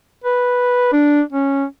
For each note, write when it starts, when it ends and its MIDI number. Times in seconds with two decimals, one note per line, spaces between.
0.24 0.88 71
0.93 1.21 62
1.32 1.64 61